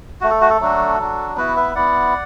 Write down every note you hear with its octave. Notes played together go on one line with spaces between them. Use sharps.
A3 F#4
A4
F#4
A4
F#3 A3 D4 F#4
F#3 D4 F#4
B3 E4 F#4 B4
B4 E5
B3 E4 D5 F#5